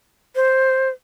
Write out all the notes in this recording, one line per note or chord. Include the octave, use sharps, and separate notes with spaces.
C5